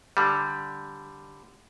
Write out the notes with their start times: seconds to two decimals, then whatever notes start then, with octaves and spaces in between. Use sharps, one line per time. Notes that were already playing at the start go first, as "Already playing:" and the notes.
0.17 D3 G3